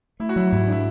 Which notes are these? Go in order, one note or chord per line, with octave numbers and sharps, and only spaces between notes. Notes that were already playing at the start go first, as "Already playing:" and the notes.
A3 E4
F#4
F#3 E4
G#2 E4
D4 E4